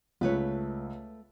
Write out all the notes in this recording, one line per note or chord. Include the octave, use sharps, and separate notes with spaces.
C#2 A3 B4 C#5